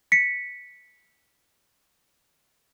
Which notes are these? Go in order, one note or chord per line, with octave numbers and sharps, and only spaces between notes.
B6 C#7